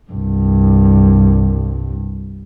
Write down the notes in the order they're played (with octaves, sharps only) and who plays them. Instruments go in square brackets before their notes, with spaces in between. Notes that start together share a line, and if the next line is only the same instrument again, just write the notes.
[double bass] C2 G2